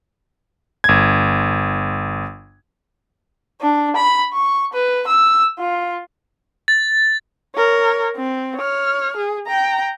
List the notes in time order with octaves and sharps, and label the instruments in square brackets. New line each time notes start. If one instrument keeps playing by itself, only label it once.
[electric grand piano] G1 G#6
[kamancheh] D4
B5
C#6
B4
E6
F4
[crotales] A6
[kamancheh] A#4 C#5
C4
C#5 F6
G#4
G5 A#5